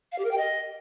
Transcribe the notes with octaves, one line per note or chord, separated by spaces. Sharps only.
F5
G4
A#4
G5
D#5